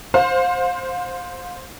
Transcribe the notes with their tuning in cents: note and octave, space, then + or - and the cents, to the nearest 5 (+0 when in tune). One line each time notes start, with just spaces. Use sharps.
C5 +0 F5 +35